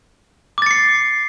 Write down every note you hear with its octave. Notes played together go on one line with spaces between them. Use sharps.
D6 A6 C7 C#7